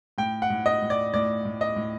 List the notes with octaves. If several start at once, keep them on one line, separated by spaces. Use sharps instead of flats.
A2 G5
F#5
A2
D#5
A2
D5
A2 D5
A2
D#5
A2